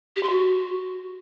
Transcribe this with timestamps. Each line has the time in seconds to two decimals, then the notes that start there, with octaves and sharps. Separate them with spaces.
0.16 G4
0.23 C6
0.30 F#4